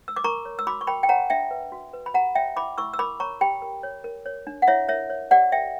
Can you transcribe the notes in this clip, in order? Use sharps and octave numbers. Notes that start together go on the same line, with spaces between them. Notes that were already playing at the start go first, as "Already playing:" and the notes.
E6
D6
A#4 A#5 C#6
C#5
E6
F#4 B5 D6
C#6
A#4 G5 B5
G5
C#5 F#5 A#5
D4 E5 G5
B4
F#4
B4
B5
G4 F#5 A#5
C#5 E5 G5
E4 B5 D6
E4 C#6 E6
E6
A#4 B5 D6
C#5 A#5 C#6
G4 G5 B5
A#4
C#5
A#4
C#5
D4
F#5
E4 C#5 E5
A#4 C#5 E5
C#5
G4 D5 F#5
A#4 E5 G5